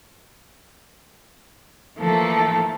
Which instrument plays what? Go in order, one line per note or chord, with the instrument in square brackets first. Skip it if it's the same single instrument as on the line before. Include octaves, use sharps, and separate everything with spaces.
[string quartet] E3 F3 A3 A#3 A4